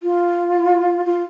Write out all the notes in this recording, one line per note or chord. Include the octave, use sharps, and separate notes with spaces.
F4
F4